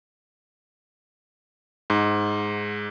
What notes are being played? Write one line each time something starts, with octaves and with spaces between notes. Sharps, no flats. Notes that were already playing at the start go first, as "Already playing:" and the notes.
G#2